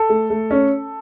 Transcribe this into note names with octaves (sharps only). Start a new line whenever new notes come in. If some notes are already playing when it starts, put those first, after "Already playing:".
Already playing: A4
A3
A3
C#4